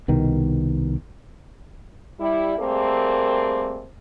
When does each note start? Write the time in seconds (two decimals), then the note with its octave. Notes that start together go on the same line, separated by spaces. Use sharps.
0.08 C2 B2 D#3
2.19 G3 E4
2.58 G3 A3 A#3 C4 G#4 A#4